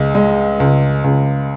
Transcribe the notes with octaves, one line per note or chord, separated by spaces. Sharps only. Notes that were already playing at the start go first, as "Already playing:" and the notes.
Already playing: C#2 G#3
G#3
C#2
C#2